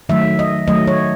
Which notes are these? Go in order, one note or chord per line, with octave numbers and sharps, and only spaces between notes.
D#3 F#3 A3 E5
D#5
D#3 F#3 A3 D#5
C#5